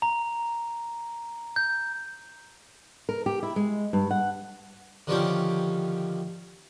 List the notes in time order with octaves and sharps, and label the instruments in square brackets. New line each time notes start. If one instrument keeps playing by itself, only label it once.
[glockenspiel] A#5
G6
[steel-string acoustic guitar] A#4
G4
E4
G#3
G2
F#5
[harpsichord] D3 D#3 F3 C#4 G4